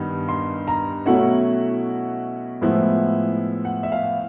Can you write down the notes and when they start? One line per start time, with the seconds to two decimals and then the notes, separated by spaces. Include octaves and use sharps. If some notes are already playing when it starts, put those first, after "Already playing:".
Already playing: G2 D#3 G3 B3 D#4
0.29 C6
0.68 A#5
1.06 B2 F#3 A3 C#4 E4 F#5
2.61 A2 F3 G#3 B3 E4
3.65 F#5
3.83 E5
3.92 F5